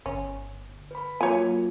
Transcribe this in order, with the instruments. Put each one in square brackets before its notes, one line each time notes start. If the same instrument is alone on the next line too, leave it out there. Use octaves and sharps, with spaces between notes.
[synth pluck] G1 [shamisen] C#4
[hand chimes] B4 B5
[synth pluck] F#3 A#3 [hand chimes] F4 [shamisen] C#5 G#5